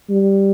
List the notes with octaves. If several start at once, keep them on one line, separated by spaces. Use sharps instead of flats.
G3